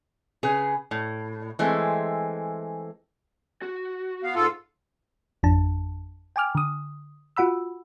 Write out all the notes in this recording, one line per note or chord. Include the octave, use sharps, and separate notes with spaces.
C#3 G#4 B4
A2
E3 G#3 A3 C4
F#4
B3 F5
G#2 F4 A4 F5
G#1 F2 D4 A5
G5 G#5 D6 F6
D3 D#6
F4 F#4 F#5 B5 E6